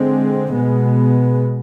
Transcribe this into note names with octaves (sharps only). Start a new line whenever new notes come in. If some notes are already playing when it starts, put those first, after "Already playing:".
Already playing: D3 G#3 C4
B2 G#3 B3